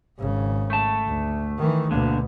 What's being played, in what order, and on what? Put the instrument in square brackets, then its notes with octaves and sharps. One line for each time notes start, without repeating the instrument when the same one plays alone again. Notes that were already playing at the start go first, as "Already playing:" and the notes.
[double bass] G#1 C#3
[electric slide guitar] A3 A5
[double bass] D2
D#3 E3
[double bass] D2 B2 [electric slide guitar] D3 A#3